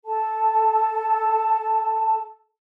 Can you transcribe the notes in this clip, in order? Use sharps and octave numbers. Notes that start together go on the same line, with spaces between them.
A4 A5